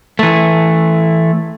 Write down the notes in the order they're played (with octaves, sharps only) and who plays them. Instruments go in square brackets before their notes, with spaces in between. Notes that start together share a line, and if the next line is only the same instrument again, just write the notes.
[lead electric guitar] E3 A3